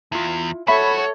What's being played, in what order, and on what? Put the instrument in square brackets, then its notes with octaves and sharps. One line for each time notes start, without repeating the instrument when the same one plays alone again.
[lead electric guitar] E2 [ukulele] E4 F4
[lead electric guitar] F#4 [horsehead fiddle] A4 C#5 [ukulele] E5 [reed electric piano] B5